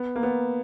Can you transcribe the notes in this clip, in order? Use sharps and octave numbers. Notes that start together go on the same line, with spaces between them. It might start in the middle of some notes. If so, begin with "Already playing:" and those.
Already playing: B3
A#3
B3